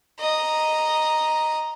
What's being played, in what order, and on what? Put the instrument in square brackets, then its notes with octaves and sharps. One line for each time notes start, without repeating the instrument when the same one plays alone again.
[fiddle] D#5 A#5